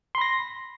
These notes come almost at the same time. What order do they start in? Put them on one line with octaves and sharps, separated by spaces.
C6 B5 A#6